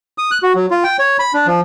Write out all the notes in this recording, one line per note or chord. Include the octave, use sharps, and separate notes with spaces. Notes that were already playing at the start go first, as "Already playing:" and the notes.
D#6
F#6
F#4
F#3
F4
G5
C#5
B5
D4
F3